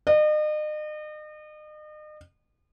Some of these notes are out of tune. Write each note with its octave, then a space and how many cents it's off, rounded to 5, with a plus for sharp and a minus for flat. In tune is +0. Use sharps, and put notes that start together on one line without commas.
D#5 -40